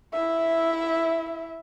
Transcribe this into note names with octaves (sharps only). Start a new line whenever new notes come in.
E4 E5